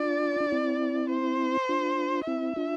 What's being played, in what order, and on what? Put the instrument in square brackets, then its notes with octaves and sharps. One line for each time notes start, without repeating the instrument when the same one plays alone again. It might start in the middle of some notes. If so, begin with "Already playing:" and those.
Already playing: [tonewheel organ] D4 F4 [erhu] D5
[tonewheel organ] D4
C4 E4
[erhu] C5
[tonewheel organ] D4 F4
[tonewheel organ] C4 E4 [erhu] E5
[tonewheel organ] D4 F4